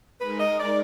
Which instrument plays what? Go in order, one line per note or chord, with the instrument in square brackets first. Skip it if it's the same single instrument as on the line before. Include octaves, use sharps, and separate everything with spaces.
[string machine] G#3 D#4 A#4 [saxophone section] B4
[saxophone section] D#5
D5